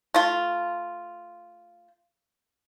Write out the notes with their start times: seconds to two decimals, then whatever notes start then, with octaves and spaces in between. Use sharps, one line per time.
0.14 A3 F4